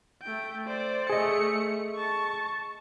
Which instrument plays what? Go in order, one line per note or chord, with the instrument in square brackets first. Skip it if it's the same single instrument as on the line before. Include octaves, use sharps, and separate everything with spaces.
[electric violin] A3 G5
C5 D5
[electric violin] A3 C#7 [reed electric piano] G#4 D#5
[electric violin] A5 C#6